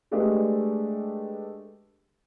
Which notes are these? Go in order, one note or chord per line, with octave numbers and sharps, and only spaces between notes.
G#3 A3 D4 G4 B4 D#5